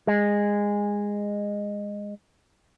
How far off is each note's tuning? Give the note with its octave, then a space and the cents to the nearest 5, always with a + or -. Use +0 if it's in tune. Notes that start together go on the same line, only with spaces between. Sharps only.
G#3 -15